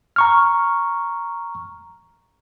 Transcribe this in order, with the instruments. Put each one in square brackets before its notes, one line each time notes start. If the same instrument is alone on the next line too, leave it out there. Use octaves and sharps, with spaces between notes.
[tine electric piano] A#5 C#6 F6